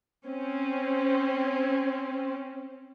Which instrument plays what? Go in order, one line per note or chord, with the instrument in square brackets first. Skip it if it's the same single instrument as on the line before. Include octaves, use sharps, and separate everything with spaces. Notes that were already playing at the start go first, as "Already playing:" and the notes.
[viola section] C4 C#4